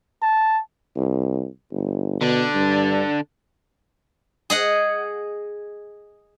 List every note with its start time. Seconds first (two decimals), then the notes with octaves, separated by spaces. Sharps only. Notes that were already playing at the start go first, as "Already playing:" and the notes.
0.22 A5
0.96 C2
1.71 G1
2.21 B2 D3 D4
2.55 G2
4.50 G#4 D#5 F#5